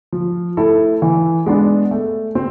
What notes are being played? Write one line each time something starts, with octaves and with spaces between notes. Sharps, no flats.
F3
A3 E4 A4
E3
G#3 B3 D4
A3
C4